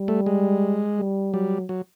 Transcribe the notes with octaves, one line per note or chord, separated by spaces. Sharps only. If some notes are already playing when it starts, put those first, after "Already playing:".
Already playing: G3
A3
G#3
G3
F#3 G3
F#3